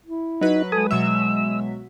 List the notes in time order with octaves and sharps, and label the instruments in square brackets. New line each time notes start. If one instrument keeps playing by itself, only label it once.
[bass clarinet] E4
[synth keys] F#3 B4 [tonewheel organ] D#4
[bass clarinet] G#3 [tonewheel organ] A4 G#5 D#6
[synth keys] B2 F#3 E5 [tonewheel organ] E6